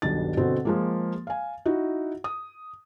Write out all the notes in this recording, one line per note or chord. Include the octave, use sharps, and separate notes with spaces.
D#1 B1 G2 B2 D4 A6
B2 D3 C4 F#4
F3 G#3 A#3
F5 G#5
D#4 E4 F#4
D#6